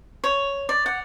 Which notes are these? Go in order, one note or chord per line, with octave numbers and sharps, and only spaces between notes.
C#5
D5
F#5